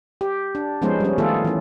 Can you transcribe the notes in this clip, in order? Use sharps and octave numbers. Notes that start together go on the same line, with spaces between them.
G4
D4
F3 G#3 B3 C#4 D#4 C5
G3 C#4
D#3 A3 B3 F4 G#4 A4
E3 C#4